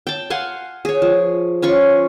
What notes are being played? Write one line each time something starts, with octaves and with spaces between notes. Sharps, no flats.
G5 A5
F5 F#5 G#5 C6
G#4 C#5
F3
C#4 F4 C#6